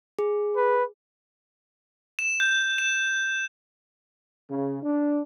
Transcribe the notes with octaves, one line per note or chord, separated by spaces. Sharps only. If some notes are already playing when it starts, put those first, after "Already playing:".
G#4
B4
E7
G6
E7
C#3
D4